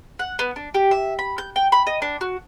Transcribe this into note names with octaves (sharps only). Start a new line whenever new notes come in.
F#5
B3
D4
G4
E5
B5
G6
G5
B5
D#5
D4
F#4